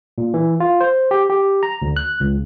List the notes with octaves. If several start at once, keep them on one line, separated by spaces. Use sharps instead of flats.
A#2
E3
F4
C5
G4
G4
A#5
D2
F#6
C#2